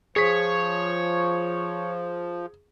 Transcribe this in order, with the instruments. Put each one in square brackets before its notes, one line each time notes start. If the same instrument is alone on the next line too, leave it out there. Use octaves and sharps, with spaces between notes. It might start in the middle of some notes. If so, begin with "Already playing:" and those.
[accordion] F3 [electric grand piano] G#4 B6 [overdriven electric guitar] C#5